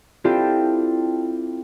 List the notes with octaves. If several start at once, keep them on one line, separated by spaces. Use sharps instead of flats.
C4 D4 E4 F4 G4 A4